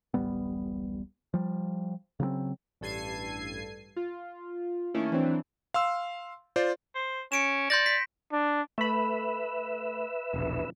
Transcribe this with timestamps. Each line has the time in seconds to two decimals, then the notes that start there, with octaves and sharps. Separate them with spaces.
0.14 D1 A1 G3 B3
1.34 F3 G3
2.20 C#3 F#3 G3 C4
2.81 A1 G2 A4 G#6 C7 D#7
3.96 F4
4.94 D#3 A3 A#3 C#4 E4
5.12 E3 F#3 C4 D4
5.74 F5 C6 E6
6.56 F4 C5 D5
6.95 C5
7.32 C#4 C#7 D7 E7
7.70 D5 C6 G6 A#6
7.86 B6
8.32 D4
8.78 A3 B4 E5 B5
10.34 E1 A#1